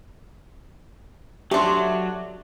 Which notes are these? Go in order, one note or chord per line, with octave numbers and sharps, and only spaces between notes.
F#3 A3 D4 G4 E5 C6